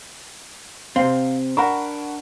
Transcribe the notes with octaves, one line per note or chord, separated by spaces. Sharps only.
C3 C4 F5
D4 A#4 F#5 B5 C#6